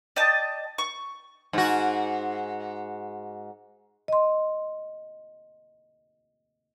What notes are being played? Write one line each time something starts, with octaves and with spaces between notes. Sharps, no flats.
D5 D#5 G5 A5
C#6
G#2 F#4
D#5 C6